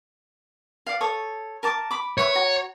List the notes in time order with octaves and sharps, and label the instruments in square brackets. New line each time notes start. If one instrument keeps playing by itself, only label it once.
[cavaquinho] D5 F5
A4 C#5 D#6
A#4 A5 D6
B5 D6
[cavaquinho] B4 E5 C#6 [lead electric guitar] C#5
[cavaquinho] F#4 A#5